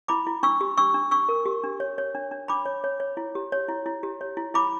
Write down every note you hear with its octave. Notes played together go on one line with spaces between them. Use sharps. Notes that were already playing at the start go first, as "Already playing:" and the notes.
E4 B5 D6
E4
D4 C#6 E6
G4
D4 C#6 E6
D4
D4 C#6 E6
A#4
G4
D4
C#5
C#5
D4
D4
D4 B5 D6
C#5
C#5
C#5
E4
G4
C#5
E4
E4
G4
C#5
E4
E4 B5 D6